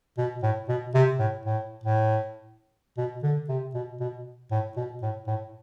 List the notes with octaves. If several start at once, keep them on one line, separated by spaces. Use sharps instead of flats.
B2
A2
B2
C3
A2
A2
A2
B2
D3
C3
B2
B2
A2
B2
A2
A2